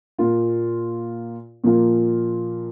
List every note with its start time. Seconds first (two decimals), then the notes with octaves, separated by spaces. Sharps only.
0.19 A#2 A#3 F4
1.64 A#2 F3 A#3 F4